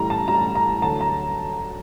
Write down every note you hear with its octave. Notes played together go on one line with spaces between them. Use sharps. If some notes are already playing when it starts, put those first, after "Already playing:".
Already playing: A2 E3 G3 A#5
A5
A2 E3 G3 A#5
A#5
D2 D3 F#3 A5
A#5